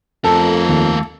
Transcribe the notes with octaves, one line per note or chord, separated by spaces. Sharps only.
F2 A3 A4 A#4
D#2